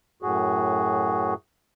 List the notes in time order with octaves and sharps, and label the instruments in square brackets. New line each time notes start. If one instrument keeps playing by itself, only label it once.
[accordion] F#2 A2 F#4 G#4